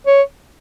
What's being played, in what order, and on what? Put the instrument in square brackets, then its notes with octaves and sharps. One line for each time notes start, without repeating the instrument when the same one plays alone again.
[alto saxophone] C#5